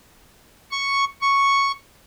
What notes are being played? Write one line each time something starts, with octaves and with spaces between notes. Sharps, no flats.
C#6
C#6